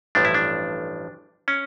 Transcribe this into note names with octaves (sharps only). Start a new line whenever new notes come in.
A1 G2 F3 A3 D4
E4
D4
C#4